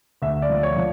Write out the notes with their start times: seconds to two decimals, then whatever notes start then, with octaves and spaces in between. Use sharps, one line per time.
0.22 D2 E5
0.42 D5
0.50 F3
0.63 C#5
0.76 F3